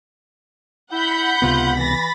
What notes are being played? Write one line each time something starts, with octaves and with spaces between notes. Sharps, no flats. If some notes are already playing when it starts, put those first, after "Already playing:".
E4 F#5 B5 G6
C#2 C3 B3 F4
E3 A6 A#6